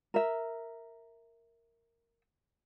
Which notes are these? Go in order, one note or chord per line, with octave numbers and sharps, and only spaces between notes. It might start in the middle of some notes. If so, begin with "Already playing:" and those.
A#4 E5